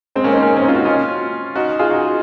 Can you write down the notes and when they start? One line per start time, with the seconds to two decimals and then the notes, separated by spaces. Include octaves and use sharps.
0.16 G#3 C4
0.24 A#3 C#4
0.33 C4 D#4
0.42 A#3 C#4
0.57 C#4
0.62 C4 D#4
0.68 F4
0.74 D#4 F#4
0.85 C#4 F4
1.56 D#4 F#4
1.79 F4 G#4
1.90 D#4 F#4